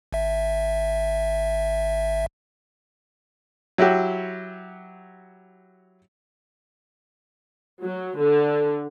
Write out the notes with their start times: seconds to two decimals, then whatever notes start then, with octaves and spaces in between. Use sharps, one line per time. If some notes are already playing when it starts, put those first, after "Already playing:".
0.13 G#1 E5
3.78 F#3 E4 F#4 G4
7.83 F#3
8.19 D3